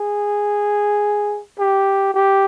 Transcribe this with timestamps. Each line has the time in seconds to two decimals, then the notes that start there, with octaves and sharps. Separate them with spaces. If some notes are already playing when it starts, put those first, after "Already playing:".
Already playing: G#4
1.59 G4
2.14 G4